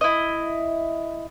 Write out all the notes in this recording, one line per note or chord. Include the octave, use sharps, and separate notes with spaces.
E4 D#5